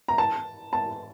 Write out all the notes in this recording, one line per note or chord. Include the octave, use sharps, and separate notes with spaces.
A#5
A5
A5